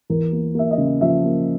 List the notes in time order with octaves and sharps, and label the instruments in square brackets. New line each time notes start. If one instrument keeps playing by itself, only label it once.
[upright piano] E2 A#4
A#3
A#3 E5
D#5
C#3
F3 E5
A#3